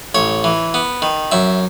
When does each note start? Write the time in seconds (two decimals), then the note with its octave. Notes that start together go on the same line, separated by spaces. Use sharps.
0.15 A1 C#5
0.44 E3
0.74 B3
1.02 D#3
1.31 F#2 E5